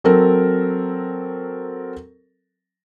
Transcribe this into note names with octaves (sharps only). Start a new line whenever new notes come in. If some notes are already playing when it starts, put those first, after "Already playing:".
F#3 C4 A4 A#4